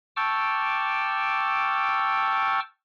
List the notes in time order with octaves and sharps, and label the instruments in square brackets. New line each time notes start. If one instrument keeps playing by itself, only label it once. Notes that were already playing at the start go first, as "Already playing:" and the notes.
[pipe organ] G5 A5 C#6 D6 E6 F6